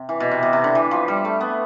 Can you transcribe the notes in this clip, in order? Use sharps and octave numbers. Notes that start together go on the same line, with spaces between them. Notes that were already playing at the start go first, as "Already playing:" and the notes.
Already playing: C3
E3
B2
C3
B2
C3
D3
E3
F3
G3
A3
B3